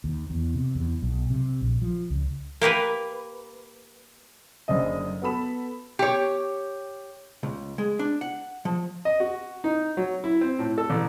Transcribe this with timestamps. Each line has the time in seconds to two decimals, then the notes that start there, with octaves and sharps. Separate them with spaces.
0.04 D#2
0.30 E2
0.54 C3
0.75 E2
1.02 B1
1.30 C3
1.61 A#1
1.82 F3
2.10 C#2
2.61 A#3 G4 A#4 B4
4.68 F#1 F#2 D3 C5 D#5
5.22 B3 F#4 A4 B5 E7
5.99 G4 C#5
7.43 C#2
7.78 G#3
7.99 D4
8.21 F#5
8.65 F3
9.05 D#5
9.20 F#4
9.64 D#4
9.97 F#3
10.24 E4
10.41 C4
10.59 A2
10.78 A4
10.90 A1